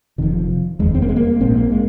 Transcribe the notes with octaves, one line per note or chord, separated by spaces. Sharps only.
F1 F2 C3 D#3
F3
F1 D#2 G#3
C4
A#3
G#3
A#3
A#1 G#2 C4
A#3
G#3